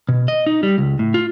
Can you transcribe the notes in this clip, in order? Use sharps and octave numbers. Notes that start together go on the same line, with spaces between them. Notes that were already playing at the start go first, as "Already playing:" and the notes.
B2
D#5
D#4
G3
C#2
A2
F4